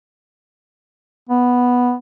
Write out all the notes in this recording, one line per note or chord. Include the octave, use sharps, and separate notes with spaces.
B3